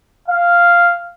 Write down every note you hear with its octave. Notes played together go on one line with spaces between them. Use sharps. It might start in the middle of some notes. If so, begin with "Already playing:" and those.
F5